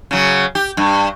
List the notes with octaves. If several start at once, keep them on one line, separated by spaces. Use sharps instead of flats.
C#3 F#3
G4
G2